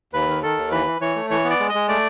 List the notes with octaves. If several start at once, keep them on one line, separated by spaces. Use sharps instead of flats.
D#2 B4
D#3
D#3 A4
D#2
E3 B4
E3
E3 C#5
A3
E3 C#5
B3
D5
G#3
D#5
G#3
A3 D5